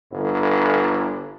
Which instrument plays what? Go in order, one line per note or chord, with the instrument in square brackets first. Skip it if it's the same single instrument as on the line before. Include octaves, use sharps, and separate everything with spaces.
[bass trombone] G1